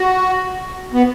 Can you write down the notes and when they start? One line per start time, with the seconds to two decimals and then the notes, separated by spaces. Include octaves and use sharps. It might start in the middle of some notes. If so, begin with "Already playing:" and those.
Already playing: F#4
0.93 B3